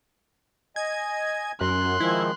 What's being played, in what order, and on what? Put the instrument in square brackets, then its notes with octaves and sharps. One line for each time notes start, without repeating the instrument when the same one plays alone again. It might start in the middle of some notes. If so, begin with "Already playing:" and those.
[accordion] D#5 G#5 [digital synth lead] G#6
[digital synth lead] F#2 [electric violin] C6 F#6
[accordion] D#3 F3 G#3 [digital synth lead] E4